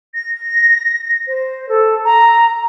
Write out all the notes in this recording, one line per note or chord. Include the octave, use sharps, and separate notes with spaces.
A#6
C5
A4
A#5